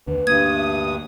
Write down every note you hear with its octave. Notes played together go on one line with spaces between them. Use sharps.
D#2 D3 B4
D2 G2 A#3 D#6 G#6
E5